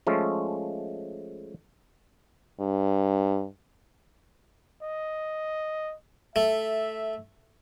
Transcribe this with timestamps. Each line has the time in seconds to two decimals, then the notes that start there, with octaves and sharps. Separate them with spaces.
0.07 F3 G#3 A3 C#4
2.60 G2
4.83 D#5
6.36 A3 E5